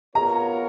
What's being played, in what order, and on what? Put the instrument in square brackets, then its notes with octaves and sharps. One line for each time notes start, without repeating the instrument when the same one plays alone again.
[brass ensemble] B3 F4 A#4 C#5 [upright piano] A#5